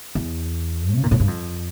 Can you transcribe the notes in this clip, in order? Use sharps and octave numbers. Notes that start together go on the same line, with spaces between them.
E2
C#3
A#2
A2
G2
F2